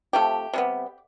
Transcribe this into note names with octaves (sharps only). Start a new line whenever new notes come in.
C3 F3 A3 G4
C3 G3 B3